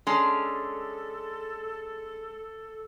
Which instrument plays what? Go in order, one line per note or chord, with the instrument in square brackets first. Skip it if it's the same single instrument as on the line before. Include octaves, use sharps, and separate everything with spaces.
[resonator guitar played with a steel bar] G#3 C#4 D4 [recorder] A4